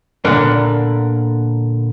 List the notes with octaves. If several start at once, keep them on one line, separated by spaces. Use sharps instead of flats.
A#2 D3 A#3 B3